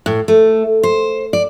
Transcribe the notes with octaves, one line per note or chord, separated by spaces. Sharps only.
A2
A3
C5
D5